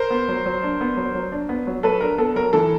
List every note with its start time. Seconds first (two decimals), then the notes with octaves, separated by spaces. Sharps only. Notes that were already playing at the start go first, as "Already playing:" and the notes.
Already playing: A#4 C5
0.10 B3
0.28 F#3
0.46 F#3
0.63 D4
0.81 B3
0.97 F#3
1.15 F#3
1.32 D4
1.49 B3
1.67 F#3
1.83 F#3 A4 B4
2.01 D4 A#4
2.18 B3 A4
2.36 F#3 A#4
2.53 E3 A4